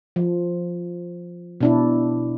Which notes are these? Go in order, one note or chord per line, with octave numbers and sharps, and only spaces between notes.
F3
B2 D4 E4